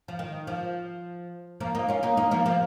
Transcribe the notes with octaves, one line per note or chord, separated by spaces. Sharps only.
F3
D#3
F3
F3 A#3
A#3 D#4
C#4 F4
A#3 D#4
A#3 D#4
F3 A#3
F3 A#3